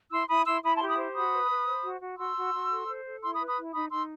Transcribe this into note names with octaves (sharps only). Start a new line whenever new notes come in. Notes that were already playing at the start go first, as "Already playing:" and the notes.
E4 C6 E6
E4 B5 D#6
E4 C6 E6
E4 B5 D#6
A5 C6
G4
B5 D#6
C5
F#4 B5 D#6
B4
B4
C5
F#4
F#4
F#4 C6 E6
F#4
F#4
A4
C5
A4
E4 C6 E6
B5 D#6
B4
B5 D#6
E4
D#4 B5 D#6
D#4 C6 E6